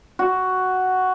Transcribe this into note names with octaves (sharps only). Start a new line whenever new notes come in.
F#4